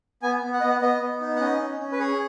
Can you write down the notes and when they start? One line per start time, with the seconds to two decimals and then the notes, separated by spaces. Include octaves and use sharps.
0.22 B3 G#5
0.43 B3
0.53 F#5
0.61 B3 D#5
0.69 F#5
0.81 B3 D#5
1.01 B3
1.21 D#4
1.36 F#5
1.40 C#4 D#5
1.60 C#4
1.79 C#4
1.92 B4
1.99 G#4 C#5